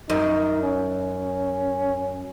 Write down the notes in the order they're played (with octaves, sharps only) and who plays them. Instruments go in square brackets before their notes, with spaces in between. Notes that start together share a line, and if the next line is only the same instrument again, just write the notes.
[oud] F#2 [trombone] D#4
[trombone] C#4